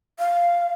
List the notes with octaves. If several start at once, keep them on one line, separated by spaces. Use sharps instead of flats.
F5